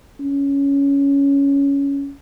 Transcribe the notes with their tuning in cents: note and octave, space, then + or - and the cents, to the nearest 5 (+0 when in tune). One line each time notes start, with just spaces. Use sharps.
C#4 +10